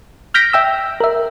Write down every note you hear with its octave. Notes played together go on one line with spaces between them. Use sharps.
F6 G6 A#6 B6 D7
E5 G5 E6
A#4 E5